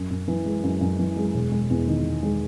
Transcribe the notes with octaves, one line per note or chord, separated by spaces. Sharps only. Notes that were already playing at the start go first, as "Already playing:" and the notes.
Already playing: F#2
F#2
E3
G#3
F#2
F#2
E3
G#3
E1
G#3
E2
D#3
E1
G#3